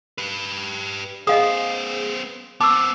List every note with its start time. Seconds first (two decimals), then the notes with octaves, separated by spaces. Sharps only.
0.18 G4 B4
1.27 B3 G#4 C5 D#5 F5 D#6
2.61 B3 C4 A5 C#6 D6 E6